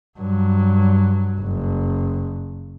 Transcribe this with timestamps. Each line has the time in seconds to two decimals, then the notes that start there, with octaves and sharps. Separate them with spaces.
0.18 G2 F#3
1.41 F#1